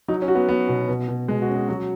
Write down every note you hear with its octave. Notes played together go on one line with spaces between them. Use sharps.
F#3 D#4
C#4
F#4
B3
F#3 B3
B2
B2
B2
B2 G#3
F#4
C#4
G#4
F#3 F#4